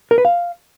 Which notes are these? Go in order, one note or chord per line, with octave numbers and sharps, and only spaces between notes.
A#4
B4
F5